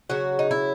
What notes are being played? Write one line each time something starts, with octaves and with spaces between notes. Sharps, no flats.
C#3 F#3 F#4
D#4
E4